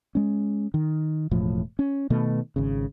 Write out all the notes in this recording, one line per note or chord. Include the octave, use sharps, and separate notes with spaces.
G#3 C#4
D#3
E1 A2 F3
C#4
B2 D#3 A3
G#1 C#3